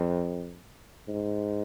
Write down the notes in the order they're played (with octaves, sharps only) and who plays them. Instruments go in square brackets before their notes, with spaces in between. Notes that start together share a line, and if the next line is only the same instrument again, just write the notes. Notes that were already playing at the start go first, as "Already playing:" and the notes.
Already playing: [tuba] F2
G#2